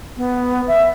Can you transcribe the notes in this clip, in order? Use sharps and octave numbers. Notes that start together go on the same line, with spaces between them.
B3
E5